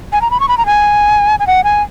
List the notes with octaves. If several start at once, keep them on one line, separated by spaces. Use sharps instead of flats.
G#5
A#5
B5
C#6
B5
A#5
G#5
G#5
F#5
G#5